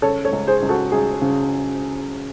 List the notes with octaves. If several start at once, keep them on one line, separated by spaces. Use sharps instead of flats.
C#3 A4 C#5
A4 C#5
C#2
G#4 C5
C#2
F#4 A4
C#2 G#4
C#3